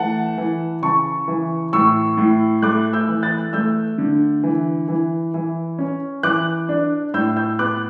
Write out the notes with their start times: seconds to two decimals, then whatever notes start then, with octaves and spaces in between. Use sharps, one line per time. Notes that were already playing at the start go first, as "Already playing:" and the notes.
Already playing: E3 A3 F#5 A5
0.38 E3
0.82 C#3 A5 C#6
1.28 E3
1.73 A2 C#6 E6
2.17 A2
2.62 A3 D6 F#6
2.93 E6 G6
3.09 E3
3.23 F#6 A6
3.53 A3 E6 G6
3.98 D3
4.43 E3
4.89 E3
5.34 E3
5.79 C#4
6.23 E3 D6 F#6
6.69 D4
7.14 A2 E6 G6
7.36 E6 G6
7.59 B3 D6 F#6